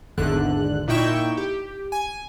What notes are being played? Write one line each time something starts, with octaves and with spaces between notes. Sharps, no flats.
G#1 E2 D3 F#6
A#2 D#4 E4 G5 C#6 E7
G4
G#5